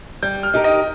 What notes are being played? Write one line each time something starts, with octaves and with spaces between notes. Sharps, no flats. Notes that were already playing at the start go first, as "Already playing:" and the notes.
G3 G6
F6
D#4 G4 A#4
D#5